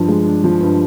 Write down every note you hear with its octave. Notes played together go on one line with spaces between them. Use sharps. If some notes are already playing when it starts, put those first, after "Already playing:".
Already playing: G2 F3 D4
G#3
D4
F3
G2